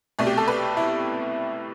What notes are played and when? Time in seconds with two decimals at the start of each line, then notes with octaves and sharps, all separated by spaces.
0.19 C2 B2 A3
0.27 G4
0.37 A4
0.48 B4
0.77 E4